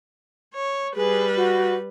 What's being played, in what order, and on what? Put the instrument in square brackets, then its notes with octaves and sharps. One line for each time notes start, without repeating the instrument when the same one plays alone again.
[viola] C#5
[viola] G3 B4 [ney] G#4
[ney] F#4